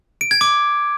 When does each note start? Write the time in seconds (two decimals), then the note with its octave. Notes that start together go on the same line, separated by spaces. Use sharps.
0.21 D7
0.31 G#6
0.41 D6